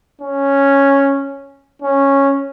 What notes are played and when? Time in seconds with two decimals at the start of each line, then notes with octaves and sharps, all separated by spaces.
0.22 C#4
1.82 C#4